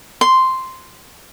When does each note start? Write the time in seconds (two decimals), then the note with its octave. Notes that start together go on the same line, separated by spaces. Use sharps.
0.21 C6